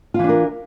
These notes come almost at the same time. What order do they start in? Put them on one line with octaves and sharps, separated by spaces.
F4 E3 D4 A#4